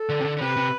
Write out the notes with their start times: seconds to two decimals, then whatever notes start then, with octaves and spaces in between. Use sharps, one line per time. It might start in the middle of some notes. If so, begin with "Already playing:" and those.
Already playing: A4
0.09 D3
0.21 C3
0.24 D3
0.37 D3
0.41 C3 B4
0.57 C3